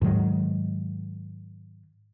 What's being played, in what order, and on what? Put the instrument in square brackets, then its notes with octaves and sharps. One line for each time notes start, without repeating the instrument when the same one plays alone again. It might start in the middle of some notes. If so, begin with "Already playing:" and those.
[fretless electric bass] G#2 D#3 F#3